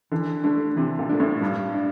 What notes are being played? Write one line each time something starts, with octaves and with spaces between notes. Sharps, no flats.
D3 E3
D3 A3 D4
C3 E3
A#2
A3 D4
A2
G2 G3
D4